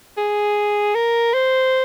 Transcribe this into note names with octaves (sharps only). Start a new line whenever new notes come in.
G#4
A#4
C5